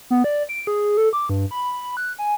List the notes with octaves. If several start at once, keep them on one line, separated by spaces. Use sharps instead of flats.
B3
D5
D7
G#4
A4
D6
G2
B5
F#6
G#5